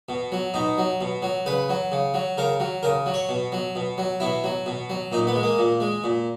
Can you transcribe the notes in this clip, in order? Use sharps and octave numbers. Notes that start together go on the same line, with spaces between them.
B2
F#3
B2 D#4
F#3
B2
F#3
C#3 B4
F#3
C#3
F#3
C#3 A#4
F#3
C#3 A#4
F#3
C#5
B2
F#3
B2
F#3
B2 E4
F#3
B2
F#3
A#2 D#4
B3
G#3
A#3
A#2
G#3
A#2